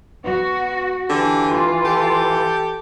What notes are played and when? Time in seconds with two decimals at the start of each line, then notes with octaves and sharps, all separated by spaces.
0.24 B3 F#4
1.09 D3 E3 G4
1.50 F4
1.85 G4 A4